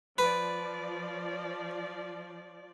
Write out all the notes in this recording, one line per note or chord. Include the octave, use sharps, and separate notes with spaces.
F3 B4 D5